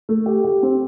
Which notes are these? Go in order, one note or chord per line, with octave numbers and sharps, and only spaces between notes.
A3
G4
G4
C4